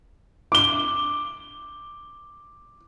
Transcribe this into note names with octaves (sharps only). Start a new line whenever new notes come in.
D6 G7